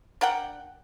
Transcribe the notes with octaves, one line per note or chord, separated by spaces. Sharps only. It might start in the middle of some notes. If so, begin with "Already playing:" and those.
D4 A#4 F#5 G5